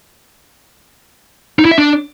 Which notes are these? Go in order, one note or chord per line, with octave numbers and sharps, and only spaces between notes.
D#4
E4
E5
D4